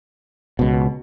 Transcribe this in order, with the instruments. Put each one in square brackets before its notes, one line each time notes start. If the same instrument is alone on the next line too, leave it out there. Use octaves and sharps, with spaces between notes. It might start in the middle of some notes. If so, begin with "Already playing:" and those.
[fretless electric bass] C#2 B2